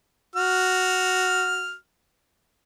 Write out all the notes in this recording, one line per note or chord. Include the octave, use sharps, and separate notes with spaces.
F#4 F6